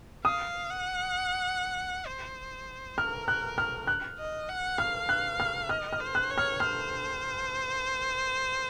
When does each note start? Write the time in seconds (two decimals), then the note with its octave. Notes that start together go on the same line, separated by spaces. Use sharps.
0.25 F5 D#6
0.70 F#5
2.07 C5
2.98 A#4 F6
3.28 F#6
3.58 F6
3.87 F#6
4.18 D#5
4.49 F#5
4.78 F5 F6
5.09 F#6
5.40 F6
5.69 D#5 F6
5.93 F6
6.00 C5
6.15 F#6
6.31 C#5
6.38 F6
6.60 C5 F6